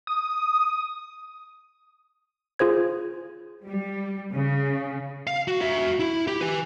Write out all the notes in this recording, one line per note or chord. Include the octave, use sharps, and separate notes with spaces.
D#6
F4 G#4 C5 G#6
G3
C#3
F5
F#4
F#4 E5
E4
G4
B4 G#5